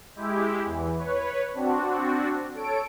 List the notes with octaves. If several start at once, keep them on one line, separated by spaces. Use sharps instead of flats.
G#3 E4 G4
E2 E3
B4 C#5
C4 D4 F#4
A4 C#5 D7